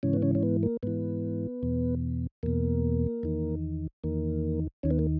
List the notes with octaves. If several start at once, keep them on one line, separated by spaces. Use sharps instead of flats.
G#2 C#3 E3 C#4
B3
C#3 C#4
C#4
B3
A#3
G#2 E3 B3
E2 B2
E2 B2 A#3
E2 D#3
E2 D#3 A#3
D#2 D#3 C#4
B3
A#3